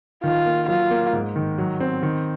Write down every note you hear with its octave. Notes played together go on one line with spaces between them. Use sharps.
D#3 F4
A#3
F#3 F4
A#3
G#2
D#3
F#3
C4
D#3